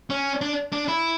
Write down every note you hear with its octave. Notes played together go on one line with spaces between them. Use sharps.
C#4
D4
D4
E4